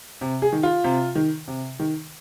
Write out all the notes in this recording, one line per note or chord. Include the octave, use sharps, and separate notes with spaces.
C3
G#4
D#3
F4
C3
D#3
C3
D#3